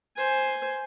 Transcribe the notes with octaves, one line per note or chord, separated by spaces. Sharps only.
C5 G#5